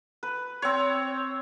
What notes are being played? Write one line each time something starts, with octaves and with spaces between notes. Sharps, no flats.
B4
C4 C#5